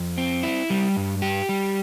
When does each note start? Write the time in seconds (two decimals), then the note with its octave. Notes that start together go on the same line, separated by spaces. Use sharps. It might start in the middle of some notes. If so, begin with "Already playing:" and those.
Already playing: F2
0.18 C4
0.43 E4
0.70 G3
0.97 G2
1.22 G4
1.49 G3